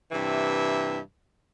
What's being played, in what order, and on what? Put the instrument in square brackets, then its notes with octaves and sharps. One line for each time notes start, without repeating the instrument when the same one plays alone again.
[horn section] G2 C3 E3 E5